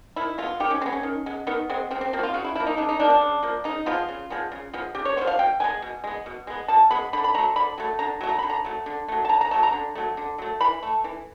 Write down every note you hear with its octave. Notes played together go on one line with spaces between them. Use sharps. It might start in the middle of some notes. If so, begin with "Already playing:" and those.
D#3 E4
G#3 B3 F4
D#3 G4
C#4
G#3 B3 C4
C#4
D#3
G#3 B3
D#3 B3
G#3 B3 C4
C#3 C4
C4
F3 A#3 C4
F#4
F4
C#3 F#4
E4
F3 A#3 E4
D#4
C#3 D4
D#4
F3 A#3 D4
D4
C#3
F3 A#3
C#3 D#4
F3 G#3 B3 F4
C#3
F3 G#3 B3
C#3
F3 G#3 B3
C#3 G4
C#5
F3 G#3 B3 C5
F5
B2 G5
G#3 B3 G#5
B2
G#3 B3
B2
G#3 B3
B2 A5
G#3 B3 B5
D3 B5
B5
F#3 A3 A#5
D3 B5
F#3 A3
D3 A#5
F#3 A3
A#5
D3 B5
A#5
F#3 A3
D3
F#3 A3
A5
D3 A#5
A#5
F#3 A3 A5
A#5
D3
F#3 A3
D3
F#3 A3
E3 B5
A3
E3